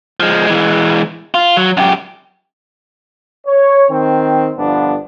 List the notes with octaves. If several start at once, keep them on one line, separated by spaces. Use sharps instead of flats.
F3 G#3
E3 G#3
F4
F#3
F#2 G4
C#5
D#3 C4
G1 F3 B3 D4